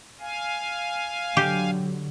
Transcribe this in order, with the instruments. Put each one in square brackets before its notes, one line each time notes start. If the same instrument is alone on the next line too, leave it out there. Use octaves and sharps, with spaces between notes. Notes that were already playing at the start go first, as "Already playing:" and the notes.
[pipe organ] F5 G#5
[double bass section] D3 F#3 [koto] G4